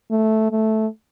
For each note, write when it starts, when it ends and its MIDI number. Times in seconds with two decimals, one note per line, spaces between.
0.11 0.48 57
0.51 0.87 57